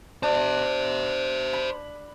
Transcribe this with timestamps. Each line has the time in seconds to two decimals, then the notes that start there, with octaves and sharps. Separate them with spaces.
0.23 D4 C5 E5
1.53 B5